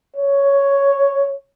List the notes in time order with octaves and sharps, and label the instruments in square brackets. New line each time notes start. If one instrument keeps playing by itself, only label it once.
[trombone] C#5